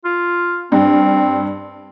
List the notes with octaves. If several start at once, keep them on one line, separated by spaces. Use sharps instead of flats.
F4
G2 C4